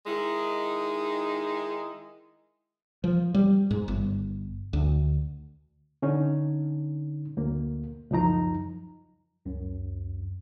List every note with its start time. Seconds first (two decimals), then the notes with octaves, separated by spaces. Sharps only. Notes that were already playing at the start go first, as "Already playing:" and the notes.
0.07 D#3 G#3 D#4 E4
3.04 F3
3.34 G3
3.71 G#2
3.88 G1
4.73 D2
6.02 D3 C#4 D#4
7.37 D2 A#3
8.11 C#2 F#2 F3 D#4 A#5
9.45 C#2 F#2